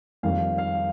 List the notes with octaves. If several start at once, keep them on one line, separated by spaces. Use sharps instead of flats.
F2 D#3 G3 A#3 F5
F5